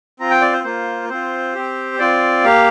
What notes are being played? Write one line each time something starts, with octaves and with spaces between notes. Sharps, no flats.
C4 F4 A#5
G5
D5
C5
A#3 F4 C5
C4 F4 C5
C4 G4
C4 F4 D5
A#3 G4 F5